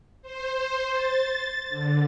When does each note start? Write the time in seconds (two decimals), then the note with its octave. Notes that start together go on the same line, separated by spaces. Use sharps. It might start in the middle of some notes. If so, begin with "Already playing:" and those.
0.22 C5
0.53 C5
0.92 A6
1.69 D3